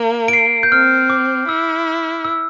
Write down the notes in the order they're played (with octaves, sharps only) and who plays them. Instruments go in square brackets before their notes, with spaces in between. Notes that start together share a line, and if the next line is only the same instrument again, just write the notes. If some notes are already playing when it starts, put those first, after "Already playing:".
Already playing: [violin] A#3
[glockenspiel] D7
C7
G6
[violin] C4 [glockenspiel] F6
[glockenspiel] D6
[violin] E4 [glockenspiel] E6
[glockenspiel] E6